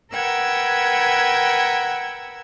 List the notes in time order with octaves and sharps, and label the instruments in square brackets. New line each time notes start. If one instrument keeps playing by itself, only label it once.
[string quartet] A#4 B4 F#5 G5 E6 G#6